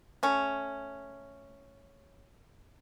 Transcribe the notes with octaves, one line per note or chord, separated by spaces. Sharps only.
A3 C#4